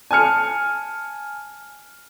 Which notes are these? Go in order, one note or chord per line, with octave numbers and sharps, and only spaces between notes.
G#5 A5 F6 C#7